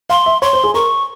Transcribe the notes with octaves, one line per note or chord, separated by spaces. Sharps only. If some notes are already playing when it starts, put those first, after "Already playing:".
F5 C6
E5
C#5 C6
C5
G#4
A#4 C#6